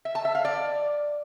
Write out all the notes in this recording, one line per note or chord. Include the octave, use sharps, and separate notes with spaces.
E5
A5
E5
F5
D5